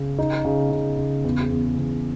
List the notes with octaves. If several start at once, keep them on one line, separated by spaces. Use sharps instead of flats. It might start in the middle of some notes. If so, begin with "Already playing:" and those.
Already playing: C#3
D#4
C#3
C#3
C#3
E2
E2
E2